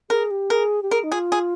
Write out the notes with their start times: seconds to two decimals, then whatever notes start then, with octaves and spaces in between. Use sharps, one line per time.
0.10 G#4 A#4
0.31 G4
0.50 G#4 A#4
0.83 G4
0.91 G#4 A#4
1.04 D#4
1.12 F4 G#4
1.32 G#4